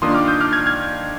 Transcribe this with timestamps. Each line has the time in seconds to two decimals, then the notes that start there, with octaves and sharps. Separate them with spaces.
0.02 D#3 A#3 D4 F4 C6 D#6
0.14 D6 F6
0.28 D#6 G6
0.41 D6 F6
0.53 F6 G#6
0.66 F6 G#6